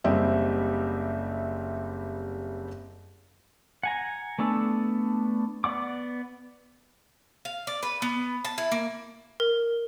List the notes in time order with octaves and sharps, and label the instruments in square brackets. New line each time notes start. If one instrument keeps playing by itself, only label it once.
[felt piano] F#1 G3 C4 G4 D#5 E5
[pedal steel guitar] F#5 G#5 A#5
A3 B3 D4 A4
B3 D5 F#5 D6
[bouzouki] F5
D5
B4
B3
A5
E4
A#3
[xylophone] A#4